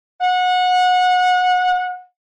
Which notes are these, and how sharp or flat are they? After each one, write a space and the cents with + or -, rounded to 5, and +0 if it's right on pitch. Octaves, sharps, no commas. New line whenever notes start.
F#5 -25